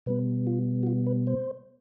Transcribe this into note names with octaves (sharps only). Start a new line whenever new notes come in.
B2 G3 B3 B4
F4
F#4
F4
B4
C5